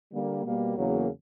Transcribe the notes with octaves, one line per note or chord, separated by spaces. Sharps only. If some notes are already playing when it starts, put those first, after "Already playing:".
D3 G3 A#3
B2 G3 A#3
E2 C#3 F#3 A#3